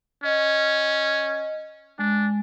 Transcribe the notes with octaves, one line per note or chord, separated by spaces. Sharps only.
C#4 D#5
G#3 D4